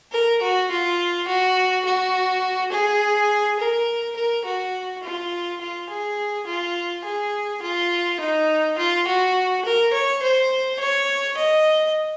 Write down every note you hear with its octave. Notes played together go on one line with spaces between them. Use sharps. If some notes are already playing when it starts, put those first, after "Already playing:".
A#4
F#4
F4
F#4
F#4
G#4
A#4
A#4
F#4
F4
F4
G#4
F4
G#4
F4
D#4
F4
F#4
A#4
C#5
C5
C#5
D#5